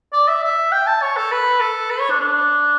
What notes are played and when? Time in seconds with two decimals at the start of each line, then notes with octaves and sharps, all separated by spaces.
0.13 D5
0.28 E5
0.43 E5
0.72 G5
0.87 A5
1.02 C#5
1.17 A4
1.32 B4
1.60 A4
1.90 B4
2.00 C#5
2.10 D4
2.20 D4